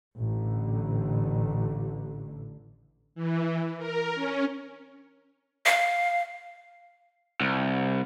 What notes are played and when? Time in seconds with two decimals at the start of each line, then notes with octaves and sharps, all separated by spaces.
0.17 A1 D3
3.15 E3
3.78 A#4
4.15 C#4
5.66 F5
7.41 C2